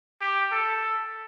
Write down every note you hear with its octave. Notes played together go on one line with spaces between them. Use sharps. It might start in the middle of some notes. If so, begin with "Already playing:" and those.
G4
A4